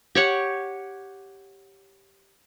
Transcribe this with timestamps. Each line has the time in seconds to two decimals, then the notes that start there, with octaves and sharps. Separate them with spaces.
0.15 G4 C#5 F#5